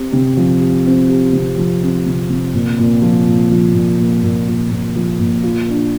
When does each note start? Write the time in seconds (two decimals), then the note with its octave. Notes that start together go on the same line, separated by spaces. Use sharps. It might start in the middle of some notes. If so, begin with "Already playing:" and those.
Already playing: C4 G4
0.13 C3
0.37 F3
0.60 G4
0.86 C4
1.09 G4
1.33 C3
1.57 F3
1.82 C4
2.06 C3
2.29 C3
2.54 A#2
2.79 A#2
3.02 F3
3.26 A#2
3.51 F3
3.74 A#2
3.99 A#2
4.24 A#2
4.48 A#2
4.71 A#2
4.95 F3
5.20 A#2
5.43 F4
5.68 D4